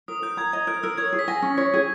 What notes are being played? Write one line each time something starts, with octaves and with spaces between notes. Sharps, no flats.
A#4 D#6
A#4 G6
A#5 G#6
D#5 G#6
A#4 G6
A#4 E6
C#5 G#6
G#4
B6
G#5 A#6
C#4
C#5
G#4